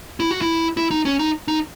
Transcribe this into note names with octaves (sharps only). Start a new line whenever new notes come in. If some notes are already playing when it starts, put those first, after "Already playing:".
E4
F#4
E4
E4
D#4
C#4
D#4
D#4